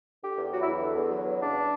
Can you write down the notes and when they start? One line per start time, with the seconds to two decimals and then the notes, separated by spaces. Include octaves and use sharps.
0.21 D3 G4
0.36 E2
0.51 F#3 F#4
0.61 E4
0.65 E2
0.81 D3
0.95 E2
1.10 F#3
1.25 E2
1.40 C#3 D4